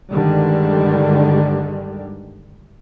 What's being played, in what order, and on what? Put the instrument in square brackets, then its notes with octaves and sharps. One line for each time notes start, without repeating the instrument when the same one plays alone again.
[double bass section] G2 D3 D#3 G3 G#3